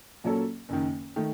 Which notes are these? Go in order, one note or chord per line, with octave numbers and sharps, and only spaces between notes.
A#2 F#3 A#3 C#4 A4
F#1 F#2 D#3
D#3 A3